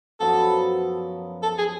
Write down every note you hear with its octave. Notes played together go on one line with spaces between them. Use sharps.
F#2 F3 B3 A4
A4
G#4